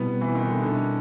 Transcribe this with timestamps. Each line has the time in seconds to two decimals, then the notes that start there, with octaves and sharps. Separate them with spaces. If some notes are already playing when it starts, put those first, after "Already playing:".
Already playing: B2 G3 B3 C4 E4
0.21 E3
0.35 D#3
0.49 D3
0.62 D3